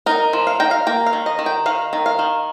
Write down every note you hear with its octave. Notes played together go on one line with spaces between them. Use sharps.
D#4 A#4
F3
F5
D#4 G5
F5
A#3 G5
F5
D#3
D#5
D#3
G5
D#3 F5
D#3
F5
D#3